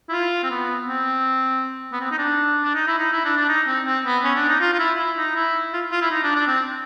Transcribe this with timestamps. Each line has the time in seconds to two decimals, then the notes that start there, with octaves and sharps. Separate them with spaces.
0.09 E4
0.12 F4
0.43 C4
0.50 B3
0.88 C4
1.92 B3
2.00 C4
2.11 D#4
2.18 D4
2.63 D4
2.75 D#4
2.87 E4
2.99 D#4
3.12 E4
3.25 D4
3.37 D4
3.48 D#4
3.67 C4
3.86 C4
4.05 B3
4.24 C#4
4.35 D4
4.49 D#4
4.61 F4
4.74 F4
4.79 E4
4.98 E4
5.17 D#4
5.36 E4
5.73 F4
5.92 F4
6.01 E4
6.11 D#4
6.23 D4
6.35 D4
6.47 C4